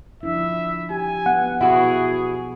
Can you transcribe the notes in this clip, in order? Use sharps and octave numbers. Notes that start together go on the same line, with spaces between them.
F3 D4 E4 E5
G4 G#5
B3 F#5
B2 B3 E4 F#4 G#4